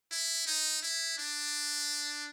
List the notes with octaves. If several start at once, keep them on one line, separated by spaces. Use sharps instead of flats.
E4
D#4
E4
D4